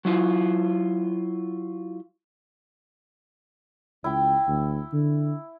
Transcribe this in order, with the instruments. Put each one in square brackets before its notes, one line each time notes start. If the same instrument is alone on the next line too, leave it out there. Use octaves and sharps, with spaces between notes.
[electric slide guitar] F#3 E4 F4
[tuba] C#2 [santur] E4 G5
[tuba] D2
D3